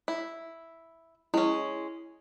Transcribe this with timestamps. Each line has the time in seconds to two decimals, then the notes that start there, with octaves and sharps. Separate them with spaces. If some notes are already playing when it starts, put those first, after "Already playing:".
0.08 E4
1.34 G#3 C#4 E4